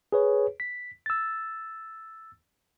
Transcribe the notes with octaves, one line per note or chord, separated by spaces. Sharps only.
G#4 B4 C#5
B6
E6 A6